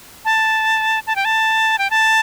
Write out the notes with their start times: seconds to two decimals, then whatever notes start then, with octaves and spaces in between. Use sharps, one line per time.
0.25 A5
1.07 A5
1.16 G5
1.25 A5
1.78 G5
1.90 A5